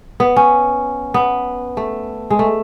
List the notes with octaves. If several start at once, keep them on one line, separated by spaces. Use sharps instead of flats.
B3
C#4
B3
A3
G#3
A3